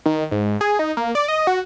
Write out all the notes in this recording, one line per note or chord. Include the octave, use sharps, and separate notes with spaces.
D#3
G#2
G#4
D#4
A#3
D5
D#5
F#4